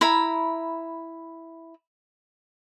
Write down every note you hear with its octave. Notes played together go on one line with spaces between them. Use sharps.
E4 A#5 B5